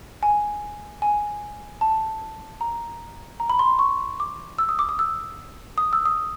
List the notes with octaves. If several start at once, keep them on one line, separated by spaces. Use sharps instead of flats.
G#5
G#5
A5
A#5
A#5
B5
C6
C#6
D6
E6
D#6
D6
D#6
E6
D#6
E6
D#6